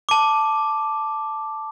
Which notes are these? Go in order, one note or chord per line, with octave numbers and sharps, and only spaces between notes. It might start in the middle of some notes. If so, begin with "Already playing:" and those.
A5 D6